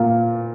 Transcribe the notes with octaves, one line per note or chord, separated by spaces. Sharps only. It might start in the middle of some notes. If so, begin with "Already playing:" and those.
Already playing: A#2 A#3 F4 A#4